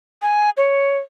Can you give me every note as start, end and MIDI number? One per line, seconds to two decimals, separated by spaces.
0.22 0.50 80
0.57 0.98 73